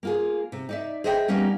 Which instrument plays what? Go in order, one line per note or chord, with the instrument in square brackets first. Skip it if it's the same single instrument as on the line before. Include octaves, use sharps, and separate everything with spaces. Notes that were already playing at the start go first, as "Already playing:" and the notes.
[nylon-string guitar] A#3 F4 G#4
C3
D#4 D5 E5
G#4 C5 D#5 E5 F#5 G5
G3 A#3 B3 C#4 D#4